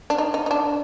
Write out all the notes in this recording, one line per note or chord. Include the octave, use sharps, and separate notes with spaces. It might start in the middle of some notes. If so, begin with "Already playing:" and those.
D4
D#4
D#4
D#4
D4